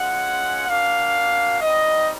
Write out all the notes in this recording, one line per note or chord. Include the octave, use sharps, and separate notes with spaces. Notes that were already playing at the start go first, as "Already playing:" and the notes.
Already playing: G#3 C#4 F4 F#5
A#3 D4 F#4 F5
G3 C4 D#4 D#5